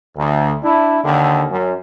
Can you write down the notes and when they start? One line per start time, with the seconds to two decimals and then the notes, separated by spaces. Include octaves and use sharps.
0.17 D2
0.63 D4 E4
1.03 D#2 D3
1.50 F#2